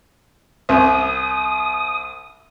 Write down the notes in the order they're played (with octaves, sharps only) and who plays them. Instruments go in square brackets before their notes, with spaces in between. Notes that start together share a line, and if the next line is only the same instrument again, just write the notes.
[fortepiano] C2 [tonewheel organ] D#6